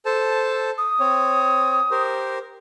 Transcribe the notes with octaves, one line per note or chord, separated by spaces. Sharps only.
A4 C5 A5
D#6
C4 C#5
G4 A#4 C5